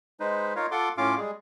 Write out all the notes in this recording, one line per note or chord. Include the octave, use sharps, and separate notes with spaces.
G#3 D#4 B4 C5
D#4 F4 A#4 C#5 F5
F4 A4 F#5 C6 D6
A2 C#4 F4 F5 D6
G3 G#3 G#4